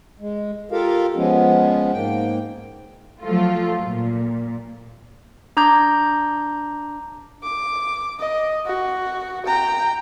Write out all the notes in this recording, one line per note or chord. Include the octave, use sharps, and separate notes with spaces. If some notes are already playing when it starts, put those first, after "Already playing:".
G#3
F4 G4 A4 A#4 F5
F3 G#3 B3 C#4
G#2 A#3 G5
F3 F#3 A3 F4
A#2
D4 A#5 D6 G6
D6
D#5
F#4
G5 A#5